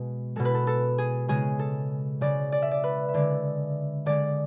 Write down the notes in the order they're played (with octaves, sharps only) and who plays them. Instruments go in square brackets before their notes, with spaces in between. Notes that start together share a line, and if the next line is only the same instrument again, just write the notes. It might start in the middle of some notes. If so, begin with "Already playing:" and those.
Already playing: [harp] B2 G#3
B2 G#3 A4
B4
A4
A4
G#4
C#3 G#3 G#4
A4
C#3 G#3 D5
D5
E5
D5
B4
E5
D3 G#3 D5
D3 G#3 D5